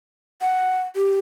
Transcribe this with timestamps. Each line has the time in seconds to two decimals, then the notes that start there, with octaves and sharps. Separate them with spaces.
0.42 F#5
0.96 G4